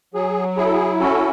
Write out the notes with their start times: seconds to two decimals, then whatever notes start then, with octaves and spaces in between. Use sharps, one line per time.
0.14 F#3 G#4
0.57 E4 G#4
0.65 A4
0.73 G#4
1.00 C#4 F#4 A4